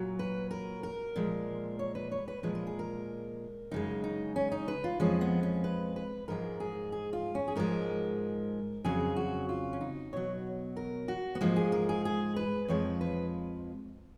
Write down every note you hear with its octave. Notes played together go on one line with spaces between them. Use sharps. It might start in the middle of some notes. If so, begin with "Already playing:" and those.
Already playing: A#2 F#3
B4
A#4
A#4
A#2 F3 G#3
C#5
B4
C#5
B4
A#2 F3 G#3 B4
A#4
G#4
A#4
F#2 C#3 G#3 D#4
D#4
C#4
D#4
B4
F4
F2 F3 G#3 C#4
B3
C#4
B4
B4
G#2 F3 G#3 A#4
G#4
G#4
F4
C#4
G#4
G#2 F3 G#3 A#4
F2 C#3 F#3 G#4
F#4
F4
C#4
D#4
B2 F#3 C#5
A#4
F#4
B3
G#2 F3 G#3 A#3
G#4
A#4
G#4
G#4
B4
F2 F3 G#3 C#5
B4